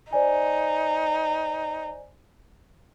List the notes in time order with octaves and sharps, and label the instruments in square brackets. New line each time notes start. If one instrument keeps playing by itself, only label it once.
[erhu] D#4 [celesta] C5 D5 G#5